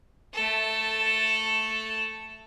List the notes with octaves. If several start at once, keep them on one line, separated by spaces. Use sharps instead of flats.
A3 A4